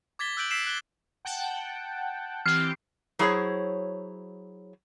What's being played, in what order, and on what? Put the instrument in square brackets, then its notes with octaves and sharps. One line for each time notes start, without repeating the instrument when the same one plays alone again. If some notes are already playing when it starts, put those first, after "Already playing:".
[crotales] D6 G#6 A6 B6 G7
E6 F#6 G6 D7 F#7
E6 B6 C7 D7 E7
F#6 G7
[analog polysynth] F#5 G5 A5
[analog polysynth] E3 C4 G4 [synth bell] F6 C7
[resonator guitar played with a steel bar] F#3 E4 G#4 C5 C#5